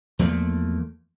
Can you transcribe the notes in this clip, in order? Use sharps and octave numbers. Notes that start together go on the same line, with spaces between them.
E2 F3 A3 A#3